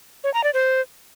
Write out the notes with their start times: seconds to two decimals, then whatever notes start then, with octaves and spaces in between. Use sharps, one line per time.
0.24 C#5
0.34 A#5
0.44 D5
0.54 C5